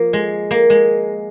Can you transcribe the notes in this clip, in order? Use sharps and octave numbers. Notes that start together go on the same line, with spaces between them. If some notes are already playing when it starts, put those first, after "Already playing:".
Already playing: F3 A#3
G#3
A#3
G#3